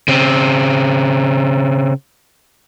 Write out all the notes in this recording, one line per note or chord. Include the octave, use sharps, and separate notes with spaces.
C#3 C4